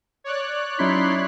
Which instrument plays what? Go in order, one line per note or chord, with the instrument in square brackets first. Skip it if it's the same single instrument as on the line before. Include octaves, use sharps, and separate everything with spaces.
[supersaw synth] C#5 D5 F#6
[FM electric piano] F#3 C#4 B6 [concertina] D#4 E4 C6